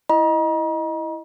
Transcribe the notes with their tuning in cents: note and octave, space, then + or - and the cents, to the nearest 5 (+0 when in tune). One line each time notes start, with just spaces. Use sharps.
E4 +0 D#5 +0 A#5 +40